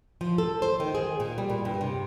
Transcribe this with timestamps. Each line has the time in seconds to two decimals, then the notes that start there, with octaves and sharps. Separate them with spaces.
0.21 F3
0.38 A4
0.62 C5
0.80 D#3
0.95 G#4
1.20 A#2
1.38 G3
1.50 A#2
1.65 G2
1.81 C3